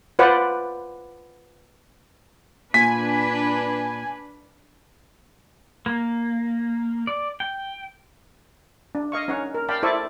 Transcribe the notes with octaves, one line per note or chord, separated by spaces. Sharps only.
F4 B4 C5 D5 F#5
A#2 D4 B4 G#5 B6
A#3
D5
G5
D4
D#5 F5 C#6
C#4 D#4 C#5 F#5
A#4
D5 F5 G5 A5 B5
E4 A4 C5 D5 E5 C#6